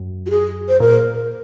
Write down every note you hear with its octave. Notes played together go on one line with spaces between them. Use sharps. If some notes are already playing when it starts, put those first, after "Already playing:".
Already playing: F#2
F#4
G#4
C5
A#2 A#4